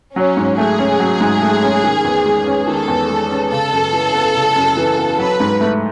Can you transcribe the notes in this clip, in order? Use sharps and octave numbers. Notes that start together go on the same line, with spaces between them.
F#3 C#4
G#2
A3 G#4
C#4
F#3
G#2
A3
C#4
D#3
E2
G#3
C#4
D#3 A4
E2
G#3
C#4
C#3 A4
F#2
E3
B3
C#3
F#2
E3
B3
F#3 B4
G#2
A3